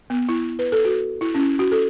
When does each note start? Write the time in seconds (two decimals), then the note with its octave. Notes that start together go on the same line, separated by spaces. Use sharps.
0.10 B3
0.29 E4
0.59 B4
0.72 A4
0.85 F#4
1.21 E4
1.35 C#4
1.39 E4
1.59 F#4
1.71 A4